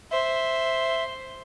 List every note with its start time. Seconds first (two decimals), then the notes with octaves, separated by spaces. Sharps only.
0.11 C5 E5